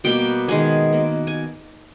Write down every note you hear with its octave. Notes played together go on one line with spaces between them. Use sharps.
B2 G3 A#3 G5
D#3 G#3 B3 G#5
B2 A#3
G#5